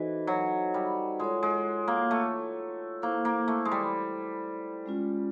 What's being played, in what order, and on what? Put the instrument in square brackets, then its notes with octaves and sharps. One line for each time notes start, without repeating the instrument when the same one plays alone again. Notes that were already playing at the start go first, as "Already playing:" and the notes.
Already playing: [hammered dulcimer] E3 [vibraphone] D#4 F#4 A4 C5 D#5
[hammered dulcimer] F#3
G3
[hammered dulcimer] G#3 [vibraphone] F4 A4 C#5
[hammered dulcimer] G#3
A#3
A3
[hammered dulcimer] A#3 [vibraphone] E4 A4 C5
[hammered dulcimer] A#3
A3
G#3
G3
[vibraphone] G#3 C#4 F4